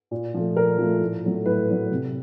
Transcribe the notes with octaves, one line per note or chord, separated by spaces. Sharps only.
A#2
F3 A3
A#2 A#4
F3 A3
A2
F#3 A3
A2 B4
F#3 A3
C3